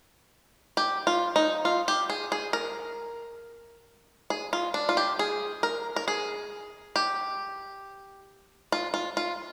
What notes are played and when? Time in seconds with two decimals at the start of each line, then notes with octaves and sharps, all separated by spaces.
0.77 G4
1.07 F4
1.36 D#4
1.65 F4
1.88 G4
2.10 G#4
2.32 G#4
2.53 A#4
4.30 G#4
4.53 F4
4.74 D4
4.89 F4
4.97 G4
5.19 G#4
5.63 A#4
5.96 A#4
6.08 G#4
6.96 G4
8.72 F4
8.94 F4
9.17 F4